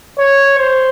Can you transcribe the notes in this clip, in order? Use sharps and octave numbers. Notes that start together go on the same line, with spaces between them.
C#5
C5